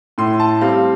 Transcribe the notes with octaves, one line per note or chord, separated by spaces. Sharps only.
A2 C6
A5
G3 C4 F5